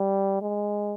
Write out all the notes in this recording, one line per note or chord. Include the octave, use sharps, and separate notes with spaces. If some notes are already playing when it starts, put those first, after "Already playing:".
Already playing: G3
G#3